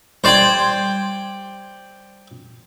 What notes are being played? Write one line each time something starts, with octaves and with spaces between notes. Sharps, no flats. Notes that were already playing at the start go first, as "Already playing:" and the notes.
G3 C5 D5 G5 C6 G#6